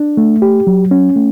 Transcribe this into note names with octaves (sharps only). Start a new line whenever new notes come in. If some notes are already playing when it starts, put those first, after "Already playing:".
Already playing: D4
A3
G4
F#3
C#4
A3